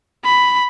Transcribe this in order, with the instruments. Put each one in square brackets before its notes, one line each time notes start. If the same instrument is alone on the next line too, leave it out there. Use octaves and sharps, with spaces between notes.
[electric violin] B5